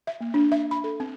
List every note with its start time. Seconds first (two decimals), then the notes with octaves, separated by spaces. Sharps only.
0.07 E5
0.21 A#3
0.34 D4
0.52 E5
0.71 B5
0.84 A4
1.00 C4